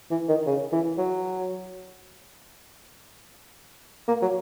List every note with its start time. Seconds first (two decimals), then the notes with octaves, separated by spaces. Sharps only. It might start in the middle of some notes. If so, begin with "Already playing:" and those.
0.11 E3
0.28 D#3
0.46 C#3
0.72 E3
0.98 F#3
4.08 A#3
4.22 F#3